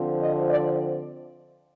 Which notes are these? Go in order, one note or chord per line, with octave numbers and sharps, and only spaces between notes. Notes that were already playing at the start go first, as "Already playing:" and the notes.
Already playing: D3 F3 C4
D#5
D5